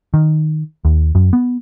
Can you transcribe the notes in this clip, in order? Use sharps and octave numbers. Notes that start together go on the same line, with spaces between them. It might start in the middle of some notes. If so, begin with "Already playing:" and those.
D#3
D#2
F#2
B3